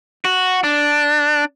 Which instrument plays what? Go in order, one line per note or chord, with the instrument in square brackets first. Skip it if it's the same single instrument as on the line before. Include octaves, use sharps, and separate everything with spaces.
[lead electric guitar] F#4
D4